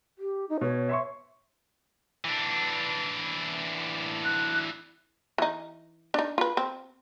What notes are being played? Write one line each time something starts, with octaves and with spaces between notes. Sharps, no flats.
G4
D#4
B2 C#5
E5 C6 C#6
E3 D4
F#6
E3 D#4
D4 D#4
F4 B4
C4